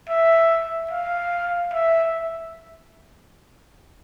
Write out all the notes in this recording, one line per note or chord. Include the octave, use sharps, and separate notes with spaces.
E5
F5
E5